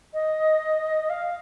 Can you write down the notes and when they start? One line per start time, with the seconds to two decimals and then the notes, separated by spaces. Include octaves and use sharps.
0.14 D#5
1.10 F5